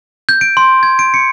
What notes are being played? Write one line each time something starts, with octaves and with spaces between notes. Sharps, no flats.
G6
D7
C6
G#6
D7
C#7